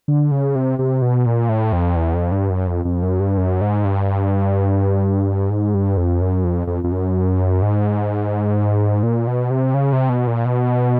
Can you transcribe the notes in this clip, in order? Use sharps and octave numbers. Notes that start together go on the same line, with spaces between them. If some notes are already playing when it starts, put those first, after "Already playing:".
D3
C#3
C3
C3
B2
A#2
A2
F2
E2
F2
G2
F#2
F2
F2
F#2
G2
F#2
G#2
G2
G#2
G2
F2
F#2
F2
F2
F2
F#2
G#2
A#2
B2
C3
C#3
C3
B2
A#2
B2